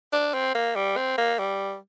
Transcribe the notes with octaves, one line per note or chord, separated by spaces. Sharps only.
D4
C4
A#3
G3
C4
A#3
G3